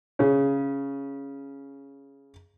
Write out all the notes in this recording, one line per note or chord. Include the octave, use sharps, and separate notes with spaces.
C#3 C#4